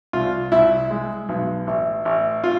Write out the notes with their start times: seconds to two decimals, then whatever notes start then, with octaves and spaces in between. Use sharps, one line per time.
0.13 C2 F4
0.52 C2 E4
0.90 G#3
1.29 B1
1.67 A1
2.05 A1
2.44 F4